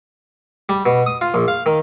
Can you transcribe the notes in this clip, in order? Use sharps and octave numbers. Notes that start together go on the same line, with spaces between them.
G3
B2
D#6
F4
A#1
F5
D#3